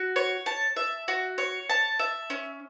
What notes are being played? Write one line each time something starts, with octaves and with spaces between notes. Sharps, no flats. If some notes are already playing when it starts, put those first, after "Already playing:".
Already playing: F#4
C#5
A5
E5
F#4
C#5
A5
E5
C#4